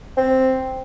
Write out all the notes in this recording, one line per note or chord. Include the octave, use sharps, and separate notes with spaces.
C4